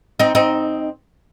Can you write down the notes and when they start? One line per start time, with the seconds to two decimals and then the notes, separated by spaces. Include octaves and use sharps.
0.19 C4 D#4
0.35 C4 D#4